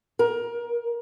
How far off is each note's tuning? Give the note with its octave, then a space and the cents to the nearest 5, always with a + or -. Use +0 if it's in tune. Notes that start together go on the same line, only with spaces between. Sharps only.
A#4 +25